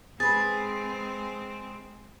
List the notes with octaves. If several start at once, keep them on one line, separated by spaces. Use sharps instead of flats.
G#3 C4 G#4 B4 A6